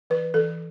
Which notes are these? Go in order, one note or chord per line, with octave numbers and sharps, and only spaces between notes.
E3 B4
E3 A4